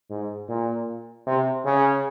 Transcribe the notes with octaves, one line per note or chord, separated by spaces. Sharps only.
G#2
A#2
C3
C#3